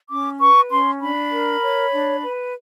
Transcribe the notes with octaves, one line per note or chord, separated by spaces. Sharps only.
C#4 D6
B4 C#6
C#4 C6
D4 B5
A#4
C#5
D4
B4